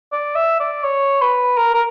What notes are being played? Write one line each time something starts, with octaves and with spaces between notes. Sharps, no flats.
D5
E5
D5
C#5
B4
A#4
A#4